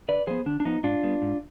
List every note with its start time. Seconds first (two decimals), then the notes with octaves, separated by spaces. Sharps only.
0.08 D3 B4 D5
0.27 F3 B3 G#4 C5
0.46 D3 D4
0.60 D4
0.65 F3 B3 D#4
0.83 G#2 D4 F4
1.03 G3 B3
1.22 G#2